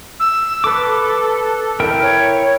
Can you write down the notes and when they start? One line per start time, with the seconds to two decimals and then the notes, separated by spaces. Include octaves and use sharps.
0.20 E6
0.64 A4 B4 D6
1.80 E4 A#4 G5
2.03 C#5